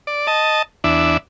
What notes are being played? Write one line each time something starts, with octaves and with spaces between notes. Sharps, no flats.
D5
D#5 A5
E2 D4 E5